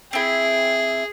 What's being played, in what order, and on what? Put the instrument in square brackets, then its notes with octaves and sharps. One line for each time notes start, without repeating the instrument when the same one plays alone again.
[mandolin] C4 E4 [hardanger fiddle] G#4